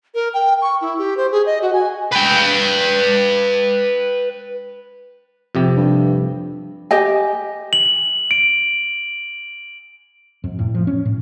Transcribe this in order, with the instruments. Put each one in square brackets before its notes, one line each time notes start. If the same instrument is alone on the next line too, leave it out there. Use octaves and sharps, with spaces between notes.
[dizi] A#4
G5
C#6
E4
G4
C5
G#4
D#5
F#4
G#5
[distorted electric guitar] B4 G5
[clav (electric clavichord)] F2 C3 G4
[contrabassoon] G2
[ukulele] G4 D#5 G#5
[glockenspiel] F#7
D7
[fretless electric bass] F2
A2
F3
C#4
A2